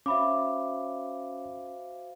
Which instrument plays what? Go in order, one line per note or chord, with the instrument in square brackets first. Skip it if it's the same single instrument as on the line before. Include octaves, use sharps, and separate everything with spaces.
[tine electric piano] C#4 [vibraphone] F#4 C5 F5 [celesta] E5 B5 D6